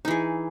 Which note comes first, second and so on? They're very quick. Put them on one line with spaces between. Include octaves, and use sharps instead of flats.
D#4 E3 G#4